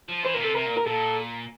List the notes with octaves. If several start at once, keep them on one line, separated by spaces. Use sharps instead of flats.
F3
E3 C5
A#2 A#4
C3 A4
C3 A#4
A#2
A#4
A#2 A4